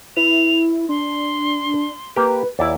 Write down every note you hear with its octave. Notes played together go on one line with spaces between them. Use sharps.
E4 B4 F7
D4 C6
A#3 G4 B4
D#2 E4 D5 D6